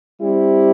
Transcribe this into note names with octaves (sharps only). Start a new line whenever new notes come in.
G3 C4 E4 G4